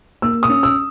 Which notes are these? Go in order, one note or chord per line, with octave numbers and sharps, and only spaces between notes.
A#3 E6
D#6
C#4
E6